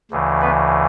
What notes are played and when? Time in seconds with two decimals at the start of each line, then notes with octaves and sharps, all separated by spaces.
0.11 D2 C#3 E3
0.41 B3 B4